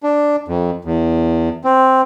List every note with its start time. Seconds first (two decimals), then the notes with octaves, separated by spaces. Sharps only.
0.03 D4
0.48 F2
0.85 E2
1.64 C4